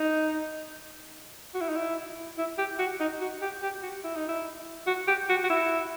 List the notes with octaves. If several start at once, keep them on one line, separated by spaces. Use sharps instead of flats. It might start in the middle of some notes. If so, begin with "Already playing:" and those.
Already playing: D#4
F#4
E4
D#4
E4
E4
G4
F#4
D#4
F#4
G4
G4
F#4
E4
D#4
E4
F#4
G4
F#4
F#4
E4